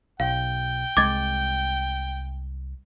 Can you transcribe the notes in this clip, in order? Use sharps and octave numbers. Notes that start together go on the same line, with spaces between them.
B1 F5 G5
C2 G#3 D6 G#6 A6